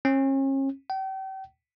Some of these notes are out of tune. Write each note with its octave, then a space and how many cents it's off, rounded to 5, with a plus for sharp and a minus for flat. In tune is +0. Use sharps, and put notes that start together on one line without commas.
C#4 -40
G5 -35